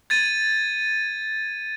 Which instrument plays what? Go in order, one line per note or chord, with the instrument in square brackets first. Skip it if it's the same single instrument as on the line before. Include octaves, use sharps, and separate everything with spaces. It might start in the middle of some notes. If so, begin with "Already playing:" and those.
[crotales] G#6 A6 D#7